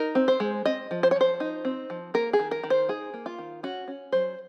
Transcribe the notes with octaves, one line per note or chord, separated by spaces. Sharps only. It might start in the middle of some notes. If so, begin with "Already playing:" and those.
Already playing: D#4 A#4
C4
C5
G#3
C4 D#5
F3
C5
C#5
F3
C5
D#4
C4
F3
A#3 A#4
G#4
D#3
A#4
D#3
C5
D#4 G#4
A#3
F4
D#3
C#4 F#4
C#4
F#3 C5